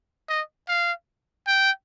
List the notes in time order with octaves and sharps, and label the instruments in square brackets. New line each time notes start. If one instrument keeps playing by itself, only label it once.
[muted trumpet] D#5
F5
G5